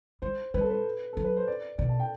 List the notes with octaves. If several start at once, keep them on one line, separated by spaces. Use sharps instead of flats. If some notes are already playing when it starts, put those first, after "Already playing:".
G3 C5
G3 B4
A4
B4
F#3 A4
B4
C5
D5
B2 D5
A5
G5